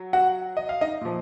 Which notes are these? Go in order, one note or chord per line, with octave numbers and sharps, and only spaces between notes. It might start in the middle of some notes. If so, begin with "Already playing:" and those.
Already playing: F#3
F#4 F#5
D#5
F5
D#4 D#5
A#2 F3